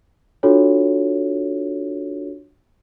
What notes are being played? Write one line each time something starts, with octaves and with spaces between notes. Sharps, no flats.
D4 F4 F#4 A4 C#5